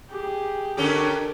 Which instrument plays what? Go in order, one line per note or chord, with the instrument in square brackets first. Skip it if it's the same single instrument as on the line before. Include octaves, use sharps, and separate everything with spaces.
[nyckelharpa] G4 G#4
[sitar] D3 C#4 G4 [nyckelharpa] A4 A#4